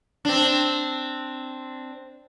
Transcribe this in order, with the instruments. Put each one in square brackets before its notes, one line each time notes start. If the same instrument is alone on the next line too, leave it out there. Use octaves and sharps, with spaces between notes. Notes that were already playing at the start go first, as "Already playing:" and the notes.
[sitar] C4 D4